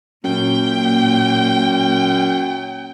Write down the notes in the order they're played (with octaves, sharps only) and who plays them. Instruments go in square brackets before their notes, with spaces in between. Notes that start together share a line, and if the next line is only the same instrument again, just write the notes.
[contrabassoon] F#2 [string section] A#2 [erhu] G5